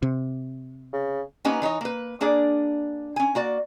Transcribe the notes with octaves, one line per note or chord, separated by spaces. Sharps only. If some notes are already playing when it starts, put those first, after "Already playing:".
C3
C#3
A#3 B3 C#4 D#4 G4 B4
E3 D#4 C#5 D#5
A#3 B4
A#3 D4 G#4 D5
C#4 G#5
A#3 F#4 D5